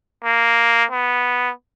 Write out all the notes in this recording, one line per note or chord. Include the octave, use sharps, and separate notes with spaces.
A#3
B3